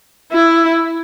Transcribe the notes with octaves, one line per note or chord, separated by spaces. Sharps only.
E4